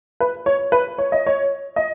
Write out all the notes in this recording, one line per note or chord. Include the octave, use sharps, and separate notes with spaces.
B4
C#5
B4
C#5
D#5
C#5
D#5